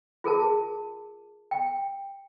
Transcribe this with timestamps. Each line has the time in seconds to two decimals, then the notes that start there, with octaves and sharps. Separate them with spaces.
0.24 F4 G#4 A#4 A5
1.51 G5